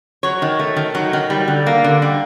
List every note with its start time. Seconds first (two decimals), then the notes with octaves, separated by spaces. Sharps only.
0.23 F#3 C#5
0.42 D#3
0.59 A3
0.76 D#3
0.95 F#3
1.13 D#3
1.30 G3
1.48 D3
1.66 A#3
1.84 D3
2.02 G3